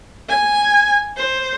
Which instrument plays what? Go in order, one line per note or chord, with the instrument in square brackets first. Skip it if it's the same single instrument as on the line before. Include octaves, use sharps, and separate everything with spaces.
[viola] G#5
C5